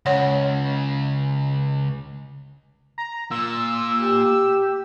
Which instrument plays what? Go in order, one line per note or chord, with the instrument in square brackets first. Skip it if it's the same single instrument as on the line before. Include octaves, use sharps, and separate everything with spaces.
[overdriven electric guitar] C#2 C#3 [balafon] C#5 F#5
[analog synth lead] A#5
[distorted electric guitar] A#2 [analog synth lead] E6
[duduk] G4